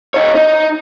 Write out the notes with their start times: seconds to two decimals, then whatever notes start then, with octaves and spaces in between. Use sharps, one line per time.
0.14 D#4 C#5
0.35 D#4